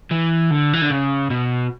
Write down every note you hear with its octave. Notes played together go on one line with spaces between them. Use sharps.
E3
D3
E3
D3
C#3
B2